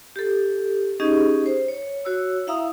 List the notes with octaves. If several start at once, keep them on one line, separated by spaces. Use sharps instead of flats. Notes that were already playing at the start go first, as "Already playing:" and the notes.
G4 A4
C#4 D#4 G4 G#4 D#5
C5
C#5
F#4 C#5 E6
E4 E5 F5 A#5 D#6 E6